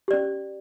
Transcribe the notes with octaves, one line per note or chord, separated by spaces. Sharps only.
C#4 G4 D5